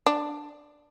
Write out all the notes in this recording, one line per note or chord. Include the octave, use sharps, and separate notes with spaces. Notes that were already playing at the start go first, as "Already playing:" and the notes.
D4